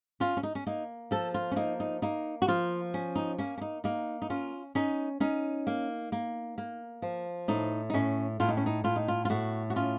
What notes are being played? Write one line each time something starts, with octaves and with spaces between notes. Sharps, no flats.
C#4 F4
C#4
D#4
C#4
A#3 D#4
F3 A4
F4
C#4
A#3 D#4
D#4
A#3 D#4
F#4
F3 F4
C#4
D#4
A#3 C#4
C#4
D#4
A#3 D#4
D#4
C#4 F4
C#4 D#4
C#4 D#4
A#3
A#3
A#3
F3
A2 D#4
D#4
A2 C#4
A2 F4
D#4
C#4
D#4
A2 F4
D#4
F4
F4
A2 F#4
F#4
C#4 F4